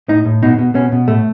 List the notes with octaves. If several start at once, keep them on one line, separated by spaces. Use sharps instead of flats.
A2 D#4
A2
B2 D#4
B2
B2 C#4
B2
A2 A3